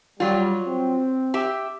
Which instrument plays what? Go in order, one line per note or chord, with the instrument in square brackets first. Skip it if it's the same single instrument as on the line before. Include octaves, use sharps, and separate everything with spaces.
[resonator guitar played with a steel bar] F#3 F4 [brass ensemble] G3
[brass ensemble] C4
[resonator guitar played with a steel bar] G4 E5